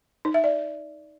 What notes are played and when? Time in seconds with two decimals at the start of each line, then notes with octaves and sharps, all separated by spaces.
0.25 D#4
0.34 E5
0.44 D5